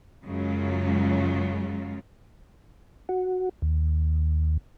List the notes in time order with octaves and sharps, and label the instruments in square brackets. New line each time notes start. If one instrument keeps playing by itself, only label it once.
[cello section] F#2 C#3 F#3 G#3 F4
[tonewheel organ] F#4
D#2